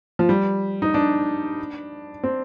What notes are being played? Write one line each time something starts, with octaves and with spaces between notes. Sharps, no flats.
F3
G3
D#4
D4
C4